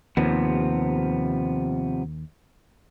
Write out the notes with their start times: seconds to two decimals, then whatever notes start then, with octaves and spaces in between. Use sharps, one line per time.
0.17 D#2 C3 F3 B3